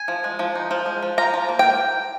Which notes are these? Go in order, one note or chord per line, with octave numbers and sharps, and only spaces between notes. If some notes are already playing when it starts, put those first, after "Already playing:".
Already playing: G#5
F3
G#3
F3
D#4
F3
G#3
F3
F4 A#5
F3
A#3
G5